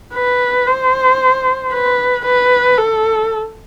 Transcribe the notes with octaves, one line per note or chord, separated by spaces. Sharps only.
B4
C5
B4
B4
A4